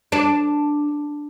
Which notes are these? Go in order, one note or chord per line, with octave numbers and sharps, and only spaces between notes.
D4